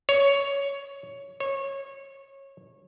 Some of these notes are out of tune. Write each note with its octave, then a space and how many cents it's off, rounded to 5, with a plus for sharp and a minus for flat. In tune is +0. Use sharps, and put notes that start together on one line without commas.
C#5 +10
C#5 -20